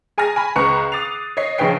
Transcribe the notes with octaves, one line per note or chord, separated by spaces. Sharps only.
G#4 G#5 A#5 F6 A#6
G#5 B5
C#2 B4 A#5 C#6 F#6 C#7
D6 D#6 A6 C7 F7
C#5 D#5 C7
A#1 C#3 C#4 B4 G5 C7